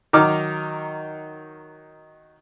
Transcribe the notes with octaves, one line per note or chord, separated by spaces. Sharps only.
D#3 F#3 D#4 D6 F6